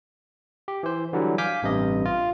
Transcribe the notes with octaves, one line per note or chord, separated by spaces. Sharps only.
G4
E3 C5
D3 E3 F#3 G3
F5 G#5 D6 F6 G6 B6
A1 G2 C3 D#5
F4